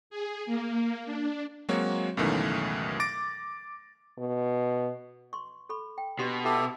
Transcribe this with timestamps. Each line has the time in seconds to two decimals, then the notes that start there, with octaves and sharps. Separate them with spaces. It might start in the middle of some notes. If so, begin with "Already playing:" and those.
0.10 G#4
0.46 A#3
1.05 D4
1.69 F#3 G#3 A#3 C4 F#4 C#5
2.17 C#2 F#2 B2 D#3 E3 A3
3.00 D6 A6 A#6 D7
4.18 B2
5.33 C6 C#6
5.69 A4 B5 C#6
5.98 G5
6.19 B2 D4 G4 C6
6.45 E4 G4 A4 E5 B5